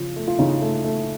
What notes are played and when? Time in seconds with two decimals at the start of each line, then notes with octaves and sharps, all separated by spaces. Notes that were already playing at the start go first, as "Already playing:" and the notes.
Already playing: C#3 F3
0.16 A3
0.27 F4
0.39 C#3 D#4
0.61 A3
0.84 A3